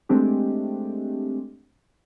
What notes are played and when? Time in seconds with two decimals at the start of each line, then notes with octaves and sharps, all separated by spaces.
0.09 G#3 A3 C4 D4 G4